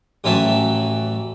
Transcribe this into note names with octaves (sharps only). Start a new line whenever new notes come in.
A1 E3 F#3 G4 E5 A5